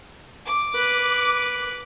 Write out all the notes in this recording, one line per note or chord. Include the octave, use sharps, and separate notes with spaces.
D6
B4